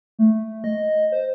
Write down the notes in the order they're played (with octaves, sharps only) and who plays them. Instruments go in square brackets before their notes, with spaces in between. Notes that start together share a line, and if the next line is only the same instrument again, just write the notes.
[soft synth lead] A3
D#5
C5